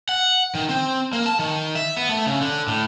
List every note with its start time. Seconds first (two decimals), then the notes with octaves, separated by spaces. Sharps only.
0.09 F#5
0.55 D#3
0.69 C4
1.13 A#3
1.26 A5
1.39 D#3
1.75 E5
1.97 B3
2.09 A3
2.26 C#3
2.41 D3
2.68 A2